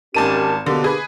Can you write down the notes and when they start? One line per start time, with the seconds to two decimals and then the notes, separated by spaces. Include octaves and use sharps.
0.14 G#1 D#3 C#4 G4 A5 D#7
0.66 B2 D3 A#3 D4 G4
0.84 G#4 B4